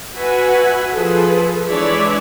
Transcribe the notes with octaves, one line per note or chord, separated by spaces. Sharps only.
F#4 B4 E5 F#5 G#5
F3 G#4 A4 B4
E3 G#3 D4 C#5 D5 E5